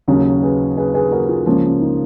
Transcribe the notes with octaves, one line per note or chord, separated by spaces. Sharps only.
D#2 C#3 F#3 C#4 D#4
G#4 B4
G#4 B4
G#4 B4
F#4 A#4
F4 G#4
C#2 C#3 F3 A#3 C#4 F4
C#4
D#4